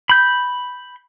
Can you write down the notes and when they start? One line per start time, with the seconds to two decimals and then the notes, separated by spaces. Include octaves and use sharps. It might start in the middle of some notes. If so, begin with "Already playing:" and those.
0.09 B5 G6